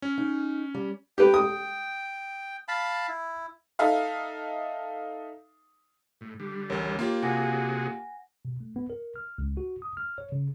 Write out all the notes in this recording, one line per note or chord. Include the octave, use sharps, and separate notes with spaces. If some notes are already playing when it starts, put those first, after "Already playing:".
C#4
D#4
G3
G4 B4 G5
D#6
F5 A5 B5
E4
D#4 A4 E5 F5
A2
D3 G3
A1 D2 A#4 C#5
A#3 F4 G4
C3 F#4 G#4 F#5 G#5 A#6
B2
A3
B3
A#4
F6
C#2
F#4
D#6
F6
C#5
C#3